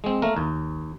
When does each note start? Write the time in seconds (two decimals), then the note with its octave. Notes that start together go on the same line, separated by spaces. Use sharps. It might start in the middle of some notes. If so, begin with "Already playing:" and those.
0.04 G#3 C4
0.22 A3 A#3 A#4
0.37 D#2